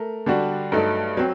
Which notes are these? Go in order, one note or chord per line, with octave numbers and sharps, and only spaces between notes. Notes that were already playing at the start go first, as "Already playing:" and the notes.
Already playing: A3 A#4
D3 G3 D4 F#4
G2 F#3 A3 D#4 A4
F#3 C4